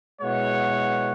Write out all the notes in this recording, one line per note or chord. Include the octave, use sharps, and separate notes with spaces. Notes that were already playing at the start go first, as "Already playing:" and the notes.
B2 G#3 E4 C#5 F#5